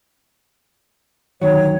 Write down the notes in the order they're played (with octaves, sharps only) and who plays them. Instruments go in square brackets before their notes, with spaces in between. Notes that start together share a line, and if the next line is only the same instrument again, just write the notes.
[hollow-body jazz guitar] D2 D#3 F#3 [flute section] C#5